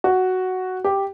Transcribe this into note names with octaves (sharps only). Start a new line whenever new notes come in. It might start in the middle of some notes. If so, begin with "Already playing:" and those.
F#4
G4